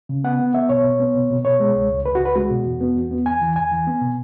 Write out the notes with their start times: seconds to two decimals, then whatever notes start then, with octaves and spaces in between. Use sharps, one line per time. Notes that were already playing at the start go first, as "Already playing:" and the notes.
0.09 C#3
0.24 B3 F#5
0.39 B3
0.54 B3 E5
0.69 B2 C#5
0.84 B2
1.00 B3
1.15 B2
1.30 B2
1.45 B2 C#5
1.60 G#3
1.75 C#2
1.91 C#2
2.06 C#2 B4
2.15 F#4
2.20 C#2
2.25 B4
2.36 G#3 F#4
2.51 B2
2.66 E2
2.81 B3
2.96 E2
3.11 B3
3.26 E2 G#5
3.41 E3
3.56 E2 G#5
3.71 E3
3.87 B3
4.02 B2